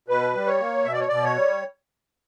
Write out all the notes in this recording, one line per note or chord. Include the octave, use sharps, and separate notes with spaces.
B2 B4
G3
C#5
A#3
B2 E5
D5
C#5
B2 D5
C#5
G3